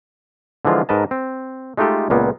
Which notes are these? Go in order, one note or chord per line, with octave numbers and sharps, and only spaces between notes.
D3 E3 F3 G#3 F4
G#2 A#4 B4 D#5 A5
C4
G#3 A3 D#4 F4 G4 A4
C#2 A#2 A#3 B3